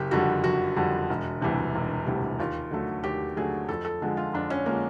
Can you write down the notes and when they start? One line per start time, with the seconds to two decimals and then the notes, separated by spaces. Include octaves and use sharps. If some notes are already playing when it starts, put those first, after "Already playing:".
Already playing: F#1 G4
0.11 F2 D3 G3 F#4
0.44 F#1 F#4
0.76 F2 D3 G3
1.09 E1
1.41 D2 C3 E3 G3
1.75 E1
2.06 D2 C3 E3 G3
2.39 D#2 F4
2.71 D3 F#3 A3
3.03 D#2 G4
3.37 D3 F#3 A3 G#4
3.69 F2 A4
3.85 A4
4.02 D3 F3 G#3
4.17 F4
4.33 F2 D4
4.50 C#4
4.66 D3 F3 G#3 A#3